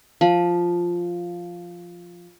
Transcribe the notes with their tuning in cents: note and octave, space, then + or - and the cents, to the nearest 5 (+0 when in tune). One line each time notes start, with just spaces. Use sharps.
F3 +0 B5 -30